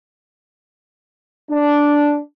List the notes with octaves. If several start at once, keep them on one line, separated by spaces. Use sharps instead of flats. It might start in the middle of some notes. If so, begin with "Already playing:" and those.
D4